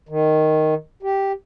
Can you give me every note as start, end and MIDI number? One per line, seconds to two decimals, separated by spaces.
0.09 0.74 51
1.03 1.32 67